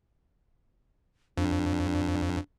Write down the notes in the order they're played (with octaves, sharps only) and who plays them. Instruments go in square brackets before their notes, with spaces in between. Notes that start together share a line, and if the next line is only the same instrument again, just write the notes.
[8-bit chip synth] F2 [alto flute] D4